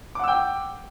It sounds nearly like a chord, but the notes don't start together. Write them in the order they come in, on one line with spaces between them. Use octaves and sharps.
D6 F#5 E6 G5